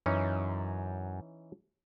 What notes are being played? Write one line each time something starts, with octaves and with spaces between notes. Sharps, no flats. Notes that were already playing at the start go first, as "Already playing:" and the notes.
F#2 E3 C#4 D#4